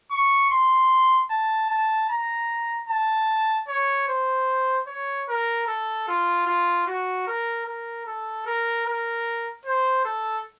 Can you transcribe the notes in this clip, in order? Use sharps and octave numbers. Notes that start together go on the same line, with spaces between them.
C#6
C6
A5
A5
A#5
A5
C#5
C5
C#5
A#4
A4
F4
F4
F#4
A#4
A#4
A4
A#4
A#4
C5
A4